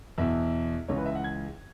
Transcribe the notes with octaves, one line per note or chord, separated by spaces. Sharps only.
E2 B2 E5
C#2 C#3 E3 C#5
B4
E5
F#5
G#6